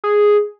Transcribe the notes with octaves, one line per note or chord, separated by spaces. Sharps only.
G#4